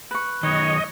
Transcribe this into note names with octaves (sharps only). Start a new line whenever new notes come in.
B4 C#6
F#2 D#3 C#5 D#5